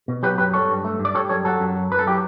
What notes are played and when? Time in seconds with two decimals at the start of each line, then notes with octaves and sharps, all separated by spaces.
0.08 B2
0.23 F#3 G4 B4
0.38 F#2 G4 B4
0.54 G3 A4 C#5
0.69 G2
0.84 A3
1.00 G2
1.05 D5
1.15 G3 A4 C#5
1.29 F#2 A4 C#5
1.45 F#3 F#4 A4
1.60 F#2
1.75 F#3
1.91 F#2 B4
1.99 A4
2.06 F#3 E4 G4